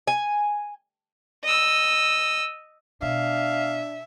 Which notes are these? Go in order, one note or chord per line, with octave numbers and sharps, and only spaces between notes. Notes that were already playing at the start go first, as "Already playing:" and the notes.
G#5
D#5 E6
B2 D4 E5 F5